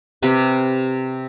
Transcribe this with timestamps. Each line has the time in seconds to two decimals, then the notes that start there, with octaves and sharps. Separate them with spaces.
0.22 C3 G4 B4